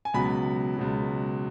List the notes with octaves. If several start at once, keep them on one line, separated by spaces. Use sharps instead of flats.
G#5
C#2 B2 F#3 B5
C#2 B2 F#3